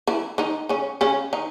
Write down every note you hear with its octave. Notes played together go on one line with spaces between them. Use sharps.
E3 E4
D#3 D#4
C#3 C#4
C#3 C#4
D#3 D#4